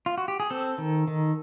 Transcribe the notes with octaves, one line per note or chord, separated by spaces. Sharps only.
F4
F#4
G4
G#4
C4 A4
D#3
D#3